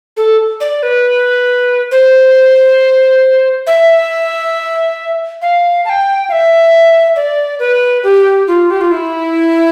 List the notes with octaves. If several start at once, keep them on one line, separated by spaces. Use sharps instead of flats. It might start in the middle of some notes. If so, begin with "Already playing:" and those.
A4
D5
B4
C5
E5
F5
A5
G5
F5
E5
D5
B4
G4
F4
G4
F4
E4